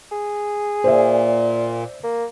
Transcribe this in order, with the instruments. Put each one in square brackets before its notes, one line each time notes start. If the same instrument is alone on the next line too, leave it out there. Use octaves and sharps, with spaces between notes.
[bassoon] G#4
[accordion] A#2 [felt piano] C5 D5 E5
[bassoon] A#3